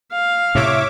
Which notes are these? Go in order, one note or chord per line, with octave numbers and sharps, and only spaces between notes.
F5
A2 C3 C#5 E5 D6